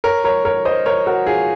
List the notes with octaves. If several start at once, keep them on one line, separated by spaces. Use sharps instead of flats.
A#4 C#5
A#4 C#5
A#4 C#5
C5 D#5
A#4 C#5
F#4 A#4
F4 G#4